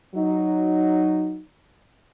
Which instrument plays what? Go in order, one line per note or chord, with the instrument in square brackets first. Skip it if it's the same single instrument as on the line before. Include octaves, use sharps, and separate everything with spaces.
[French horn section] F#3 D#4